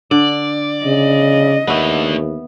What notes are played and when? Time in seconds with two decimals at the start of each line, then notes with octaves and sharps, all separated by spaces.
0.11 D3 D5
0.85 C#3 D#5
1.67 D#2 A3 B3 D4 E5